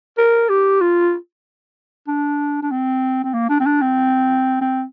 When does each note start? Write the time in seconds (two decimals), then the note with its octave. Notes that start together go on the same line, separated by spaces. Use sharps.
0.18 A#4
0.49 G4
0.81 F4
2.08 D4
2.63 D4
2.71 C4
3.24 C4
3.34 A#3
3.49 D4
3.60 C4
3.66 D4
3.81 C4
4.61 C4